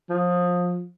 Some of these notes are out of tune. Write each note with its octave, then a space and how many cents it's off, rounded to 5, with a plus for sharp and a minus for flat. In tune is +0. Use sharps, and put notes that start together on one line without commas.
F3 +25